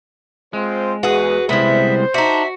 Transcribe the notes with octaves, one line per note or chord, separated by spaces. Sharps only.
G#3 C4 F4 C5
E2 F#4 G#4 B4
C2 G3 G#3 B3 E4 C5 E5
D4 D#4 F#4 E5